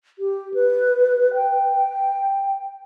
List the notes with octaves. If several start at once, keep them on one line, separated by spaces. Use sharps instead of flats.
G4
B4
G5